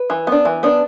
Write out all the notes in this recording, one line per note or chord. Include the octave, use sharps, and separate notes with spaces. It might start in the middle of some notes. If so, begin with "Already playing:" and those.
Already playing: B4
E3
B3 D4
E3
B3 D4